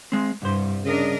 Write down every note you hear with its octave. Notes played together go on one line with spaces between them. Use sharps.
G#3 C4
C2 G2 C5
C#3 D4 A#4 D#5